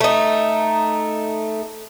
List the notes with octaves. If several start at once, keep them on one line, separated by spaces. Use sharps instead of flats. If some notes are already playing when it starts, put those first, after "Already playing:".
A3 D#4